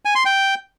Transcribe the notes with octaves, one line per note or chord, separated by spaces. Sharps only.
G#5
C6
G5